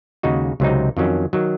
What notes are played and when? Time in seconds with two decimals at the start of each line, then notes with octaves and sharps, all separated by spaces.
0.23 D#2 C#3 G#3 D#4 F#4
0.60 C#2 C3 F#3 C4 D#4
0.97 F2 D#3 F#3 C#4
1.33 D#3 F#3